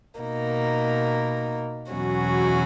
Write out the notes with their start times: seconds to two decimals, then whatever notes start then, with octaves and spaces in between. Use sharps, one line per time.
0.19 B2 A#3 D#4
1.92 E2 B2 F#3 C#4 F#4